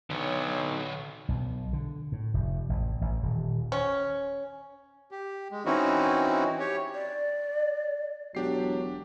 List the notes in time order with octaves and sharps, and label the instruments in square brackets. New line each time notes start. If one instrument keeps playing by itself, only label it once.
[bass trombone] B1 [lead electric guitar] D3 C#5
[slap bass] B1
D3
A2
F1
A1
A1
D#1
[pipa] C#4
[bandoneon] G4
G#3
E3 C4 C#4 D#4 E4 F#4
G4 C#5
[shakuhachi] D5
[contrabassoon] E1 [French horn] F#3 [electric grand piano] D4 G4 C7